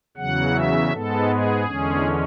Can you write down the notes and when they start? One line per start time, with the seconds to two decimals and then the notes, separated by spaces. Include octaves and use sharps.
0.17 E2 C#3 F#3 F#5
0.54 E5
0.91 G#2 G#3 B3 A4
1.29 G#4
1.66 E2 D3 G#3 C#4